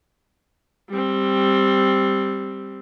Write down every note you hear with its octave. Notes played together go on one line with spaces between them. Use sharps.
G3 C4